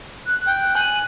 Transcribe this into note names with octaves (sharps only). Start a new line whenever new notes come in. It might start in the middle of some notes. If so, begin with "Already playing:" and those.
F#6
G5
G#5 F#6